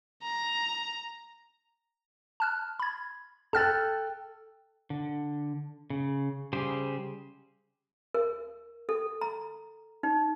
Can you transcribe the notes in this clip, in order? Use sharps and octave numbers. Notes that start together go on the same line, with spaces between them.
A#5
A5 F6 F#6
B5 G#6
A4 G5 A5 F6 F#6 A6
D3
C#3
C#3 G3 G4 G#4 C5
A#4
A4
A#5
D#4